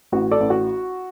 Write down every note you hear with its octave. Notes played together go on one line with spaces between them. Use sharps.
A1 F#4
A4 D5
A1
F#4